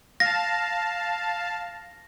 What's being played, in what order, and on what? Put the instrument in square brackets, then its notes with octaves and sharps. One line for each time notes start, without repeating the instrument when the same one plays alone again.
[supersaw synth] F5 A5 [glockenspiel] A#6